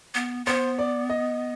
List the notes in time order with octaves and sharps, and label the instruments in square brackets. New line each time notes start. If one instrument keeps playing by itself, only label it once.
[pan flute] B3
[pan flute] B3 [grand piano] C5
[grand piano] D5
D#5